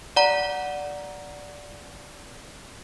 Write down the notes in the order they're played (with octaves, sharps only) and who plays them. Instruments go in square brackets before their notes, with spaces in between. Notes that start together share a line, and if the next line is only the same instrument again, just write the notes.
[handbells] D5 F#5 A#5